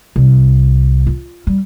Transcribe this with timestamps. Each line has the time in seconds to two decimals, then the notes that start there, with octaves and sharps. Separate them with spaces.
0.16 C2
1.07 F4
1.47 G3